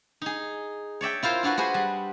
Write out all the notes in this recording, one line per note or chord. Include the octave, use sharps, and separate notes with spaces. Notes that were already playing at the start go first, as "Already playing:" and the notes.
D#4 G#4
C#5 D5 E5 G5
E4 F4 A#4 C5
D4 F4 F#4 B4
F#4 G#4 B4 C5
G3